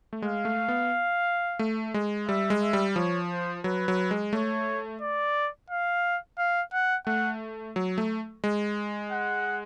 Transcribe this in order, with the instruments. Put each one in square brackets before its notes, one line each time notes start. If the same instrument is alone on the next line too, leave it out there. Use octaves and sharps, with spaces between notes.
[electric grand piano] A3
[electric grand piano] G#3 [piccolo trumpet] F5
[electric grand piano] A3
B3
A3
G#3
[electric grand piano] G3 [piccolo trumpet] E5
[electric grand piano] G#3
[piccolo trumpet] E5
[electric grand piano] G3
[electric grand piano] F3 [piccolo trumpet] C#5
[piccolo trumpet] C5
[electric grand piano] F#3 [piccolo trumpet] B4
[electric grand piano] F#3
G#3
[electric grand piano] A3 [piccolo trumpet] C#5
[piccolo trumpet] D5
F5
F5
F#5
[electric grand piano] A3 [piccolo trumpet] F#5
[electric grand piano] F#3
A3
G#3
[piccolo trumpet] F#5